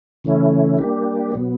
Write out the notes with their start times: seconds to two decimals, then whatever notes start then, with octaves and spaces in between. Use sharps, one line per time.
0.24 C#3 E3 A3 C#4 E4
0.77 G3 A#3 D4 G4
1.32 B2 F#3 B3